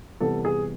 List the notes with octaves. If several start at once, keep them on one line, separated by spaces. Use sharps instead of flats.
C3 E3 G3 B3 A4
G#4